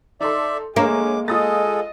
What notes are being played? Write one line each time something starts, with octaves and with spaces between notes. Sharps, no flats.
D#4 A4 D5 E5 C6
D2 G#3 A#3 C#5 D6 E7
G#3 F4 G#4 A4 D#5 D#6 A6